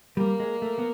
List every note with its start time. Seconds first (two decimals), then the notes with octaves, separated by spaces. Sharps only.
0.17 G3 A#3
0.40 G#3
0.62 A3
0.79 B3